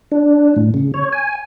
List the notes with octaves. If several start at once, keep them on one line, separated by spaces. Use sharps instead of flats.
D4
A2
C#3
C#5
G#5